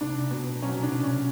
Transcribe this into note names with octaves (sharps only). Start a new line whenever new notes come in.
C2 D4
B2
F#3 C#4
D4
C2
C#4